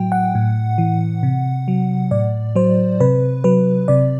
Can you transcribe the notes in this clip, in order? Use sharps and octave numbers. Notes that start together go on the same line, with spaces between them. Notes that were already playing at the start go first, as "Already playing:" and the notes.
Already playing: A2 F#3 G5
F#5
A2
E3
C3
F#3
A2 D5
F#3 C5
C3 B4
F#3 B4
C3 D5